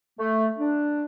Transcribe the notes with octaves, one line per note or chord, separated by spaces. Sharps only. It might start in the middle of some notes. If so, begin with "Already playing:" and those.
A3
D4